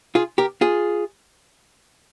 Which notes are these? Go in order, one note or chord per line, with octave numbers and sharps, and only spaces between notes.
F4 G#4
G4 A#4
F4 G#4